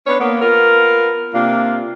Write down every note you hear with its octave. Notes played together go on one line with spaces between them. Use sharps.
B3 C#4 D4 C#5
A#3 B3
B3 F4 A#4
C3 A#3 D4 F4